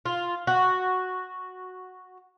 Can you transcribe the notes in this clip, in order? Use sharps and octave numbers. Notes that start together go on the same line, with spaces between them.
F4
F#4